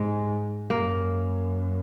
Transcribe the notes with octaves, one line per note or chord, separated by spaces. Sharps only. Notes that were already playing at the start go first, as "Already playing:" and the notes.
Already playing: G#2 G#3
F#2 A#3